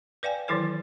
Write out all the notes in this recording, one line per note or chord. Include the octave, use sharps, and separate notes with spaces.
B4 D5 F5 G5 G#5
D#3 E3 F#3 E4 A4 C5